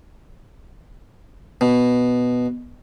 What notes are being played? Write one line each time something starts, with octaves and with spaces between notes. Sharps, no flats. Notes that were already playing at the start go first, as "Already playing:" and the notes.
B2